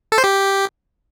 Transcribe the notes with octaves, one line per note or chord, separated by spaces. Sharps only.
A4
C5
G4